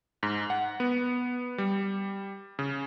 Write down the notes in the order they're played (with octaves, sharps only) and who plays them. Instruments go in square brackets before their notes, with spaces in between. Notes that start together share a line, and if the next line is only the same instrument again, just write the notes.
[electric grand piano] G#2
F#5
B3
G3
C#3